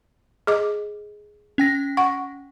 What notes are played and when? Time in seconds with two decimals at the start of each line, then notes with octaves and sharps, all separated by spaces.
0.47 G#4 D#5 D6
1.58 C#4 G5 A#6
1.97 F#5 C#6